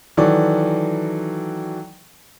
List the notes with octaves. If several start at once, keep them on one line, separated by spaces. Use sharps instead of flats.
D#3 E3 F#3 F#4 A4 D5